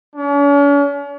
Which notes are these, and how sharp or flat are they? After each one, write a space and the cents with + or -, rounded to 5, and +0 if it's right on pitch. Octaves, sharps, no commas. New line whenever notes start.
C#4 +45